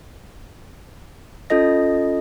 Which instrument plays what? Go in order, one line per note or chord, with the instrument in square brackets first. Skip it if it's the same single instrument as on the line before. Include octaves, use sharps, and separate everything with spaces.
[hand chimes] C#4 F4 A4 D#5 A#6